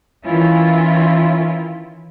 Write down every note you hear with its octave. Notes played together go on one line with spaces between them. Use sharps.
D#3 E3 C#4 E4 F4